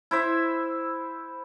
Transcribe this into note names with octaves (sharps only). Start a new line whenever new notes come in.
E4 C5 E5